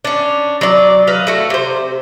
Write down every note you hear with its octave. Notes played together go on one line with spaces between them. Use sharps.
C#4 D4
F#3 D5
B4 D#5 F5
A3 F#4
C3 C5